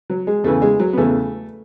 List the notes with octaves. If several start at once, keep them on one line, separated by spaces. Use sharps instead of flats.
F#3
G#3
E2 C#3 E3 A3
G#3
F#3
B3
E2 C#3 E3 A3